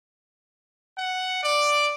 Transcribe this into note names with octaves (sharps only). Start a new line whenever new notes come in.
F#5
D5